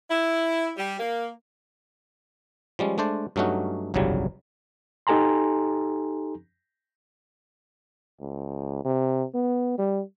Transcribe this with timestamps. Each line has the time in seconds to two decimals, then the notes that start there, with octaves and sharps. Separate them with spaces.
0.11 E4
0.78 G3
1.00 A#3
2.79 F3 G3 G#3 C#4
2.98 G#3 A3 D4 C5 D5
3.36 G2 F#3 A3 C#4 D#4 F#4
3.94 G1 C2 F2 C#3 F#3 G3
5.07 D#4 G4 A4 G#5 A#5 C6
8.20 C#2
8.85 C3
9.34 B3
9.78 G3